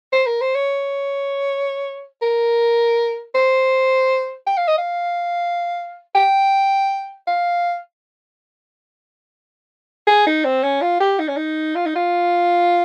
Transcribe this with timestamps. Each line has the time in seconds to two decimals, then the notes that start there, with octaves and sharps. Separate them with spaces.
0.13 C5
0.27 A#4
0.41 C5
0.55 C#5
2.22 A#4
3.35 C5
4.47 G5
4.57 F5
4.68 D#5
4.78 F5
6.15 G5
7.27 F5
10.07 G#4
10.27 D#4
10.45 C4
10.63 C#4
10.82 F4
11.00 G4
11.19 D#4
11.28 C#4
11.37 D#4
11.75 F4
11.86 D#4
11.96 F4